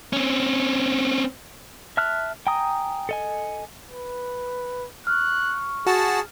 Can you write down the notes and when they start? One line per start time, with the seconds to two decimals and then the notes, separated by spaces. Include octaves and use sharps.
0.13 C4 C#4
1.97 E5 A5 F6 F#6
2.47 G5 G#5 A#5 D#6
3.09 A4 D#5 G#5
3.91 B4
5.07 C#6 F6 F#6
5.87 F#4 G#4 A5